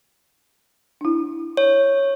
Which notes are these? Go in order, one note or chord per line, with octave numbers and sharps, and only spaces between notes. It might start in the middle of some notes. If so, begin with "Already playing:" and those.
D4 E4
C#5